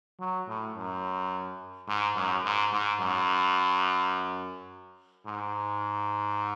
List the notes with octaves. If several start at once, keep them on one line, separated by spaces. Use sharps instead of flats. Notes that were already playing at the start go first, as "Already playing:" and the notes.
F#3
A2
F#2
G#2
F#2
G#2
G#2
F#2
G#2